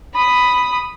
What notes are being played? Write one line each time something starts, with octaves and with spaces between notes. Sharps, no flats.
B5 D#6